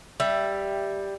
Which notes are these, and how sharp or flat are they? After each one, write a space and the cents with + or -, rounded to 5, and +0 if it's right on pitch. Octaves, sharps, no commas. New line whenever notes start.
G3 +5 E5 +15